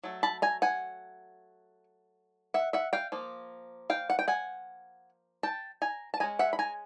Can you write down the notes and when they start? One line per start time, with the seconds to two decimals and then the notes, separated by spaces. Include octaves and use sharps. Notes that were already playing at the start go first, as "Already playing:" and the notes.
0.03 F#3 A3
0.23 A5 B5
0.42 G#5 A#5
0.62 F#5 G#5
2.54 E5 F#5
2.73 E5 F#5
2.93 F5 G5
3.12 F3 A#3
3.90 F5 G5
4.10 F#5
4.19 G5
4.28 F#5 G#5
5.43 G5 A5
5.82 G#5 A#5
6.14 A5
6.20 G#3 C#4 G#5 A#5
6.39 E5 F#5
6.53 B5
6.59 G#5 A#5